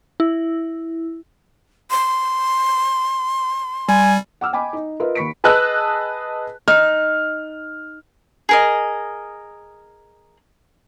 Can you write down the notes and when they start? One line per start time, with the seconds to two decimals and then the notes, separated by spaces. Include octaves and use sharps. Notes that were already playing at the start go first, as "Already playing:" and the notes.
0.20 E4
1.90 C6
3.89 G3 G#5
4.41 F#5 D6 E6 F6
4.53 D#5 G5 G#5 B5 D6
4.73 D#4
5.00 F4 A#4 B4 D#5 E5
5.15 D#2 B5 C#6 B6 C#7 D7
5.44 G#4 B4 D#5 A5 E6 F#6
6.68 D#4 F6
8.49 G#4 A#4 D#5